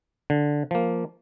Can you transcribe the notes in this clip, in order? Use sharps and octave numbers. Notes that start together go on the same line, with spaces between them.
D3
F3 A#3